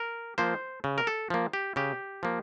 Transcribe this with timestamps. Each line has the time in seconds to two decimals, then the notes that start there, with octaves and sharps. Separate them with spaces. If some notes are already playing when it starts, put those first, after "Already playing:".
Already playing: A#4
0.38 F3 A#3 C5
0.84 C#3
0.98 A#4
1.07 A4
1.30 F3 A#3
1.53 G4
1.76 C#3 G4
2.23 F3 A#3